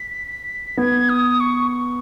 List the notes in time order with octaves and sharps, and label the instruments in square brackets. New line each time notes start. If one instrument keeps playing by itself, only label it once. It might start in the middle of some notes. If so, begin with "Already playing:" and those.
Already playing: [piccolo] B6
[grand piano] B3 [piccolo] G#6
[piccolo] D#6
C#6
C#6